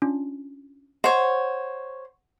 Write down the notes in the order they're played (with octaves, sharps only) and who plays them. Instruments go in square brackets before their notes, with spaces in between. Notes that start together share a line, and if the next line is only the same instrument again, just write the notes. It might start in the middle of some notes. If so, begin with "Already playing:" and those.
[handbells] C#4 D4 F4
[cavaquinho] C5 C#5 [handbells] D#5 C#6 [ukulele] F#5